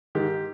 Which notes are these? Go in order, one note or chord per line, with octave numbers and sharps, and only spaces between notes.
G#2 D#3 G4